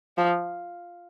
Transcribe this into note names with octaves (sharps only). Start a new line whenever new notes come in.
F3